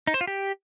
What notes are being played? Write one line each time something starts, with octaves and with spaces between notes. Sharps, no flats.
D#4
C5
F4
G4